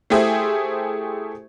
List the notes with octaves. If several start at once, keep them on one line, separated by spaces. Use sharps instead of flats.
A3 E4 G4 G#4 C5 E5